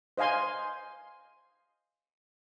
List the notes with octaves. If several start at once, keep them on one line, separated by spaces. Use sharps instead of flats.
C5 D#5 F5 G#5 C6